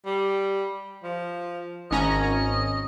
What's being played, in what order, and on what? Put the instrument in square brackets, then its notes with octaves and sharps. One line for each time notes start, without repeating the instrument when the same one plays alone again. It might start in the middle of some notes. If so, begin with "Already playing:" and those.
[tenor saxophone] G3
F3
[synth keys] G#1 C#4 A#5 [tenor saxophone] D#5